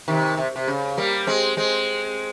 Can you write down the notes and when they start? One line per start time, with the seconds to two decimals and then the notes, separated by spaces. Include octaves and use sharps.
0.08 C3 D#3
0.37 C3
0.56 C3
0.68 C#3
0.97 G3 A#3
1.27 G#3 C4
1.57 G#3 C4